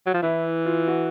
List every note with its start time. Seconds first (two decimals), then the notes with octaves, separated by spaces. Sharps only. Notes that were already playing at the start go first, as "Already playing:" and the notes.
0.06 F#3
0.14 F3
0.22 E3 E4
0.66 F4
0.88 F#4